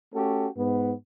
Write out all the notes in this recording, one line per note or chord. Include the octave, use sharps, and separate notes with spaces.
A3 C#4 F#4 G4 A4
G#2 B3